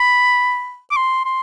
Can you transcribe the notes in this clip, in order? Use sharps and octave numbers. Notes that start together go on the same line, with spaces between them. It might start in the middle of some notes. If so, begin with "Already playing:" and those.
Already playing: B5
D6
C6
C6